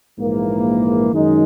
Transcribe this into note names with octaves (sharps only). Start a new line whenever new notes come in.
A#1 G#2 E3 A#3
F#2 D#3 G#3 D#4